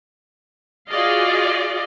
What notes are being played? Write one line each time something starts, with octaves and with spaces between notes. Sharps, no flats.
F4 F#4 G#4 D5 D#5 F5